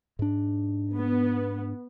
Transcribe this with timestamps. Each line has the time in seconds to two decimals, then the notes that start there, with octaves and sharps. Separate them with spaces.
0.19 G#2 D4
0.95 B3